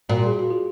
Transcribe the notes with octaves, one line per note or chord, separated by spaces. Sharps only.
A#2 F#4
G#4
F#4
F4